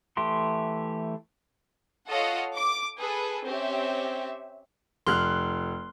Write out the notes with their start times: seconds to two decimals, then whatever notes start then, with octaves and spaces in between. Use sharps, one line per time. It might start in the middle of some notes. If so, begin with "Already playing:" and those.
0.17 E3 A3 G4 C6
2.09 F4 A4 C#5 D#5 F5 F#5
2.55 D6
3.00 G#4 A4 B4
3.46 C4 C#4 G4 E5
5.07 F1 C6 F6 F#6